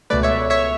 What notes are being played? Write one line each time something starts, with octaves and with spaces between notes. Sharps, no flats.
C#2 B2 A3 B4 D5
C#5 E5
C#5 E5